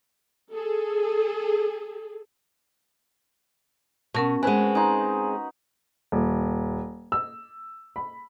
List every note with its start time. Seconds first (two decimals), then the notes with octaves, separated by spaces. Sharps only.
0.50 G#4 A4
4.14 B2 C#4 F#4 A#4 A5
4.43 G#3 C4 B4 F#5 G#5
4.75 D#4 G#5 C6
6.12 D#1
7.12 E6
7.96 B5